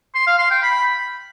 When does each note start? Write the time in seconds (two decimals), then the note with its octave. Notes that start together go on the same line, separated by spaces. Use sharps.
0.15 C6
0.27 F5
0.39 C6
0.51 G5
0.63 B5